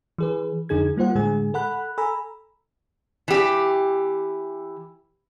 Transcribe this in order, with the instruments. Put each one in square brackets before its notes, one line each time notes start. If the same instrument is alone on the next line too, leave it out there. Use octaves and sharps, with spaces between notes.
[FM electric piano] E3 G#4 B4
F2 D3 D#4 G#4 G#6
G3 A#3 F4 C5 F#5
A2 D3 G#3 G#4 G#5
A4 F#5 B5 F#6
A4 G#5 A#5 B5 E6
[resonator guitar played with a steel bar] E3 G4